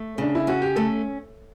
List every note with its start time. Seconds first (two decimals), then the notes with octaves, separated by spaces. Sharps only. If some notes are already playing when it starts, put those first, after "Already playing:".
Already playing: A3
0.18 C#3 D4
0.35 E4
0.47 C#4 F#4
0.62 G4
0.76 A3 A4